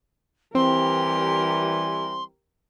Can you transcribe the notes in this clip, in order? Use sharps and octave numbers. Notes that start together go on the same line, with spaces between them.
E3 G3 C4 G4 A#4 C6